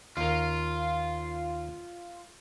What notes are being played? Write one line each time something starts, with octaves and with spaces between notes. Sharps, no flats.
D#2 F4 A#4